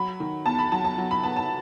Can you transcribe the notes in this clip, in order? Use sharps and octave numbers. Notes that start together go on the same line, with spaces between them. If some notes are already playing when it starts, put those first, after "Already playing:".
Already playing: F#3 B5
D#3
E2 A5
B5
F#3 A5
A5
F#3
B5
B3 A5
A5